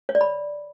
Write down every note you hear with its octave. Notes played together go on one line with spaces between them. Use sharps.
C#5
D5
B5